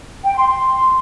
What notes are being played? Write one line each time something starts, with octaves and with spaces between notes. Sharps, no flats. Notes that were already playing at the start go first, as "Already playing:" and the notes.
G5
C6
C6